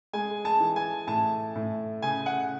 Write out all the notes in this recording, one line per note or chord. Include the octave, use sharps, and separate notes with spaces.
G#3 G#5
A5
E3
G#5
A2 A5
A2
C#3 G#5
F#5